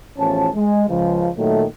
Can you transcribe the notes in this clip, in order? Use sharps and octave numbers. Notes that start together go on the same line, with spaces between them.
A1 E2 F3 C#4 A5
G#3
C#2 F3
A#2 D#3 F#3 A3